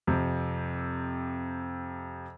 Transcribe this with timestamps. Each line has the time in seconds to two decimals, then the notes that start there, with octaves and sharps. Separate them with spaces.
0.07 F2 C3